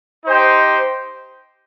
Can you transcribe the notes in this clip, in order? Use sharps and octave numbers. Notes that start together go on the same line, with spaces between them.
D#4 G4 C5 G5